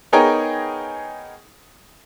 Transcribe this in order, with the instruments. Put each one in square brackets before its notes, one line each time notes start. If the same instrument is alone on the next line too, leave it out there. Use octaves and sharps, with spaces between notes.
[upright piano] B3 D#4 G#4 A#4 C#5 G5